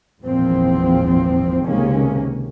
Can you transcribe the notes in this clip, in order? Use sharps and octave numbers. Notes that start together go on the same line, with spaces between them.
G#1 E2 A#2 F3 C4
C#2 C3 D#3 G#3 A#3 C#4